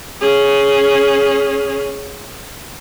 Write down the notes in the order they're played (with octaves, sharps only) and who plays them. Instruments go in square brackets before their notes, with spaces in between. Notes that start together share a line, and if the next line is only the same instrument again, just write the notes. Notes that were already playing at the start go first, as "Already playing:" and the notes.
[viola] C#4 G#4